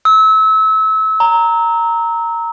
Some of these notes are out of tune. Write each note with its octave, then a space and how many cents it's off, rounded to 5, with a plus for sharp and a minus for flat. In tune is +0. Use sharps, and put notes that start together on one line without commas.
E6 -30
A#5 -10